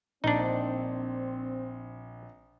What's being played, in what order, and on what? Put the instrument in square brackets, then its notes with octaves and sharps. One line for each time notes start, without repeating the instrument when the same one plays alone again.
[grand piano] A#1 [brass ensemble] C4 [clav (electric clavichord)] D4 D#4